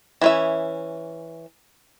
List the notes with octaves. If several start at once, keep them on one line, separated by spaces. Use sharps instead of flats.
E3 C#4 E5